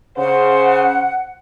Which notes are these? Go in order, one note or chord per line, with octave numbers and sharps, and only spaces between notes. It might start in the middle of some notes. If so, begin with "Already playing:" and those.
C#3 C5 F#5